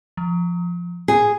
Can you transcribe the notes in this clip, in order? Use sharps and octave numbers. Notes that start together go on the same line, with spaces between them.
F3
G#4